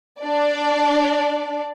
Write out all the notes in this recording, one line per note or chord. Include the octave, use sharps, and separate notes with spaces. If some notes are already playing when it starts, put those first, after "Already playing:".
D4 D5